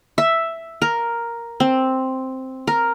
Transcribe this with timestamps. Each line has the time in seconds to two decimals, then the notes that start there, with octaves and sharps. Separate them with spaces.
0.18 E5
0.82 A#4
1.60 C4
2.67 A#4